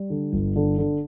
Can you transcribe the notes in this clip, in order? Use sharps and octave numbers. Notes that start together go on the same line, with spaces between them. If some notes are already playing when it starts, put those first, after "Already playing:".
Already playing: G3
D3
G1
D3
D3